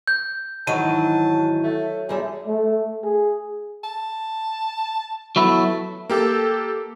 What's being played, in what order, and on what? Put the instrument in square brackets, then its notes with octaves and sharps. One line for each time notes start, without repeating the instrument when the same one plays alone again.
[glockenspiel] G6
[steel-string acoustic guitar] G#2 D#3 E3 [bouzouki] F#3 [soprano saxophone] A5 [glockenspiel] D#7
[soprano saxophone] A3
[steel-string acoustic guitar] F#2 G3 E5 [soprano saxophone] G#4
[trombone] A3
G#4
[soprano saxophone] A5
[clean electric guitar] F#3 B3 E4 [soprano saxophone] A3
[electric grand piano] A#3 G4 A4